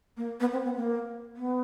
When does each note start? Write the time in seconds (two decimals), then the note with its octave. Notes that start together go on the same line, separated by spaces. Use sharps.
0.17 A#3
0.40 B3
0.52 C4
0.64 B3
0.76 A#3
1.37 B3